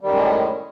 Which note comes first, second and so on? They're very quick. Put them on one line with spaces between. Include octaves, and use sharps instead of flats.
G3 D#3 F#2 G#3 A2